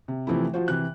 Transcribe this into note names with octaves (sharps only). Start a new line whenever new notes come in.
C3
C3 E3 F3 A3 E4
F3 F4 F#4 C5
C3 E3 F#6